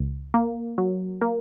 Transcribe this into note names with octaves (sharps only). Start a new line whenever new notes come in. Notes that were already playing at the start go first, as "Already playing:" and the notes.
Already playing: C#2
A#3
F#3
A#3